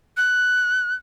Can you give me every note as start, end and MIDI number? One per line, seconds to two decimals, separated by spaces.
0.17 0.94 90